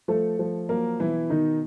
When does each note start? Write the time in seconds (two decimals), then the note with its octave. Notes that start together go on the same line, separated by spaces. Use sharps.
0.08 F3 A3 A4
0.39 F3
0.69 F#3 A#3 A#4
1.00 B2 E3 E4
1.30 B2 D#3 D#4